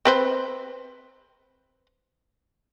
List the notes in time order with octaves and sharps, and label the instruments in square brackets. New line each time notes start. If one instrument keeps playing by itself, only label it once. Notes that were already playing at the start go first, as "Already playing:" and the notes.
[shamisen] C4 B4 C5